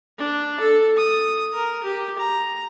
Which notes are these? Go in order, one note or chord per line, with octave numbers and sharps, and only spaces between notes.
D4
A4
D#6
A#4
G4
A#5